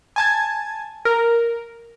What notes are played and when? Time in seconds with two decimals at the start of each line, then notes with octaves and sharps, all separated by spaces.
0.16 G#5 A5 G#6
1.05 A#4